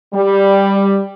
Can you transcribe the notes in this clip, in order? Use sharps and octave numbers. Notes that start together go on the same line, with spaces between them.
G3